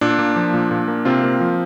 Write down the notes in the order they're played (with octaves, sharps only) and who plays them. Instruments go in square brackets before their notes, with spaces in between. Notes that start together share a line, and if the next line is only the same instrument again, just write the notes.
[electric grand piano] A#2 D4
A#3
F3
A#2
A#2
A#3
C3 C4 F4
A#3
F3